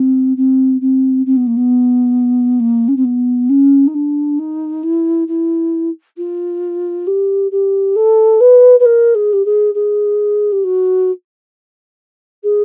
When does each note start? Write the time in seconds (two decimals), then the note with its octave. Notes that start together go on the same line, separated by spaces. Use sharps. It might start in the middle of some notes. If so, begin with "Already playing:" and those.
Already playing: C4
0.37 C4
0.81 C4
1.26 C4
1.36 B3
1.47 A#3
1.56 B3
2.60 A#3
2.88 C#4
2.96 C4
3.04 B3
3.49 C#4
3.87 D#4
3.94 D4
4.39 D#4
4.83 E4
5.27 E4
6.17 F4
7.07 G4
7.51 G4
7.95 A4
8.40 B4
8.79 B4
8.85 A#4
9.15 G#4
9.33 G4
9.45 G#4
9.74 G#4
10.52 G4
10.64 F#4
12.43 G#4